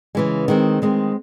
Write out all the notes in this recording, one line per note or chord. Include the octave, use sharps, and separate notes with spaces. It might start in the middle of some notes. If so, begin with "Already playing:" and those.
C#3 E3 G#3
D#3 G#3 C4
D#3 G#3 C4